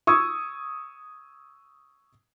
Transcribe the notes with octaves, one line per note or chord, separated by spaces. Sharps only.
C#6 D#6 E6 G#6